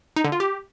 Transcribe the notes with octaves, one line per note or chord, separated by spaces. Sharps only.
D#4
D3
F4
G4